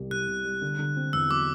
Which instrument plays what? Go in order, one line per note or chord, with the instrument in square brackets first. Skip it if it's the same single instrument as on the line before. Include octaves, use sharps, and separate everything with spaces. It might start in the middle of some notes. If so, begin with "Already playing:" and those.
Already playing: [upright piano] C2 C3 G3
[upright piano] C3 [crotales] F#6
[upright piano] C3
G3
D3
D3
C4
[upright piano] E2 [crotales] E6
[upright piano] F#3 [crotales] D6